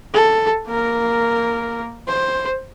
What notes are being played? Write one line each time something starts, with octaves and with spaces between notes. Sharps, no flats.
A4
A#3 A#4
C5